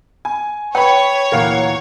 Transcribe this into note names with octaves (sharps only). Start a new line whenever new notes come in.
G#5
B4 C#5 G5 B5
D2 A#2 E3 A#4 F5 F#5